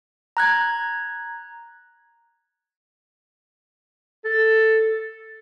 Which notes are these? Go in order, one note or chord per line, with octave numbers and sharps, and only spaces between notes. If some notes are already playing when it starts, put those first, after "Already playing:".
A#5 F#6 G#6
A4